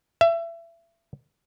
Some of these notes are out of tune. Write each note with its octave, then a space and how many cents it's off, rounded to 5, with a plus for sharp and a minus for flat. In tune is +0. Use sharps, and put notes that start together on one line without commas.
E5 +30